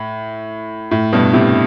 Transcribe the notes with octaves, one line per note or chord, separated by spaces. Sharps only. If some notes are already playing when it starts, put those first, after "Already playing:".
Already playing: A2
A2
G2 B2
A2 C3